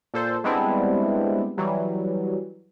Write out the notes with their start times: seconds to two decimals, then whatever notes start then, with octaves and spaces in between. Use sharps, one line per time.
0.14 A#2 A4 C5
0.44 G3 G#3 B3 C4 D4 E4
1.58 E3 F#3 G3